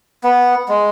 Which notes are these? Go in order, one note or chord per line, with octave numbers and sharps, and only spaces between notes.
B3
G#3